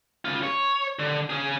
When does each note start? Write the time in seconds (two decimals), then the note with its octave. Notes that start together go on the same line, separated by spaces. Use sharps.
0.25 C#3 F4
0.43 C#5
0.99 D3
1.30 C#4 G#4